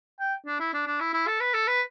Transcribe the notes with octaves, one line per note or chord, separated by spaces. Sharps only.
G5
D4
E4
D4
D4
E4
E4
A4
B4
A4
B4